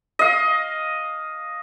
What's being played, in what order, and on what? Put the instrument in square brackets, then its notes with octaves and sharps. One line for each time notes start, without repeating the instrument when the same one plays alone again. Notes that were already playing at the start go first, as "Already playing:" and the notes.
[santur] D#5 F5